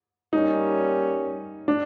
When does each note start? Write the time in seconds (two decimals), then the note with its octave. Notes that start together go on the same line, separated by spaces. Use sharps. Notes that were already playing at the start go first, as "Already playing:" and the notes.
0.33 G3 A#3 C#4 D#4
1.68 D4